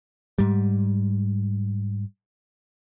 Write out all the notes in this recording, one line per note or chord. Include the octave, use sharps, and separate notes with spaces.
G#2 G3